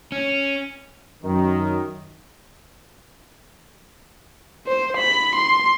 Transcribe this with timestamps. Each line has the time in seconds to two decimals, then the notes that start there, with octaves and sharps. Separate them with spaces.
0.12 C#4
1.23 F#2 D#3
4.67 C5
4.97 B5
5.35 C6